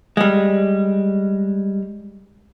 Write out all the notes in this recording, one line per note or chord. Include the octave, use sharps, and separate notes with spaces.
G3 G#3